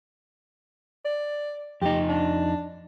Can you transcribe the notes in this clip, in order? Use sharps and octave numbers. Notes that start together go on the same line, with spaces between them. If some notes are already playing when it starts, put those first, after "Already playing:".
D5
F2 D#4 G4
D4